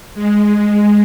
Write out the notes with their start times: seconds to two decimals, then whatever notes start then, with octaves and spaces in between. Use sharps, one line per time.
0.15 G#3